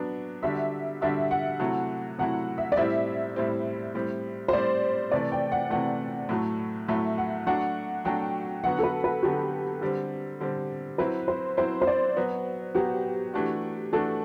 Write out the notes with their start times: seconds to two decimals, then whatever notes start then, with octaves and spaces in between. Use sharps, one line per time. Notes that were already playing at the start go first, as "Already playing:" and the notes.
Already playing: F#3 B3 D4
0.43 D3 G3 D4 F#4 E5
1.01 D3 G3 D4 F#4 E5
1.31 F#5
1.59 C3 F#3 A3 E4
2.19 C3 F#3 A3 E4 F#5
2.58 E5
2.72 D5
2.77 A2 G3 C4 E4 E5
3.36 A2 G3 C4 E4
3.95 A2 G3 C4
4.48 C5
4.53 A2 G3 C4 D5
5.11 C3 E3 A3 D5
5.32 G5
5.52 F#5
5.70 C3 E3 A3 F#5
6.29 A2 F#3 A3
6.88 A2 F#3 A3 E5
7.18 F#5
7.46 F#3 A3 D4 F#4 F#5
8.05 F#3 A3 D4 F#4 G5
8.64 D3 F#3 B3 F#4 F#5
8.79 A4
8.83 B4
9.04 B4
9.22 D3 F#3 B3 F#4 G4
9.81 D3 G3 C4
10.40 D3 G3 C4
10.98 F#3 C4 E4 B4
11.28 C5
11.57 F#3 C4 E4 C5
11.82 C5
11.87 D5
12.16 F#3 B3 F#4
12.75 F#3 B3 F#4 G4
13.34 E3 A3 D4 F#4
13.93 E3 A3 D4 F#4 A4